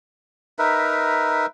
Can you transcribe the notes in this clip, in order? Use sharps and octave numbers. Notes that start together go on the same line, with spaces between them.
D#4 A#4 B4 E5